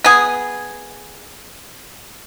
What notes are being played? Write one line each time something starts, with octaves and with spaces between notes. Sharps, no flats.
B3 G#4